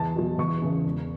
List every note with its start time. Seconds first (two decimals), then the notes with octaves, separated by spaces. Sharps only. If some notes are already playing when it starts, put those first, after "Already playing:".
Already playing: E2 A5
0.16 B2 F#3
0.39 E2 C#6
0.62 C#3 E3
0.86 E1